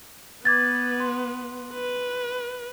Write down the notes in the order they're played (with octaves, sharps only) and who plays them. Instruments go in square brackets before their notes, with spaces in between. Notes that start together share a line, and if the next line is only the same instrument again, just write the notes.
[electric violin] B3 B4 [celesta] D6 G#6 A6
[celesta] C6
[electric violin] B4